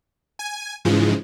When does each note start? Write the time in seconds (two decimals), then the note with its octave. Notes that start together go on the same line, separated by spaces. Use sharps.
0.39 G#5
0.85 G#2 C#3 E3 F3 G#3